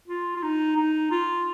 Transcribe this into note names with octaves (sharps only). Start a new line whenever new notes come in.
F4
F4
D#4
D#4
F4